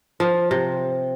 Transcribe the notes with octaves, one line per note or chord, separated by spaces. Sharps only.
F3
C3